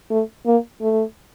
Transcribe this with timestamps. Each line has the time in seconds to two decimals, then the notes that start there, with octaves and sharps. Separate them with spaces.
0.11 A3
0.46 A#3
0.81 A3